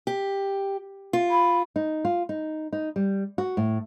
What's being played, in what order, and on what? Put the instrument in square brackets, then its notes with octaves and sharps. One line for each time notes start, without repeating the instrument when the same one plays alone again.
[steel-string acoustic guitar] G4
F4
[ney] B5
[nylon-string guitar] D#4
F4
D#4
D#4
G3
F#4
A2